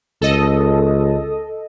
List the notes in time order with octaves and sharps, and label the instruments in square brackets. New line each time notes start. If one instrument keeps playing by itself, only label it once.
[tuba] C#2 [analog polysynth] A4 D#5